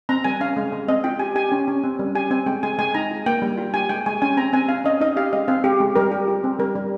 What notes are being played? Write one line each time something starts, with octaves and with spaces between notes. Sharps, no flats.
C4 A#5
G3 G#5
C#4 F5
G#3
G#3
C4 D#5
F4 G5
G4 G#5
G4 G#5
C#4
C#4
C4
G3
G4 G#5
C4 G#5
G#3 G5
G#3 G#5
G#3 G#5
D#4 A#5
F4
A#3 G5
G3
F4
G4 G#5
G#3 G5
G#3 G#5
C#4 G#5
C4 A#5
C4 G#5
C#4 F5
C#4 D#5
D#4 D#5
G4 F5
G#3 D#5
C4 F5
G#3 G4
G#3
G3 A#4
G4
F4
C4
G3 A#4
G3